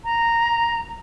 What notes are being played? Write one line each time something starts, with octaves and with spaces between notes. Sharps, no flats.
A#5